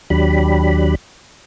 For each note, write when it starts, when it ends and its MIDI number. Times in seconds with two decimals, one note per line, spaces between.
0.10 0.95 39
0.10 0.95 54
0.10 0.95 62
0.10 0.95 67
0.10 0.95 83